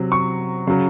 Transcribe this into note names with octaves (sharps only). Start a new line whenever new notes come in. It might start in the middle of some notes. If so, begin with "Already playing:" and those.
Already playing: C3 F#3
C#6
C#3 F#3